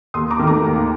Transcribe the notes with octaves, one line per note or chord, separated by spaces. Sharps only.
D#2 C6 D#6
A#5 D6
D#3 A3
A#5 D6
D#2